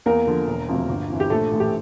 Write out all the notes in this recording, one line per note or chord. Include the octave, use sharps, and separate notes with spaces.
E2 A#3 A#4
D3 F3
E1
D2 C3 F3
G1
F2 E3
G4
A#1 A3 A4
A2 E3
G4